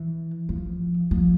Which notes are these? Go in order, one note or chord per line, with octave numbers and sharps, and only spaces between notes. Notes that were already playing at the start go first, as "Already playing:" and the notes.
Already playing: E3
F3
F3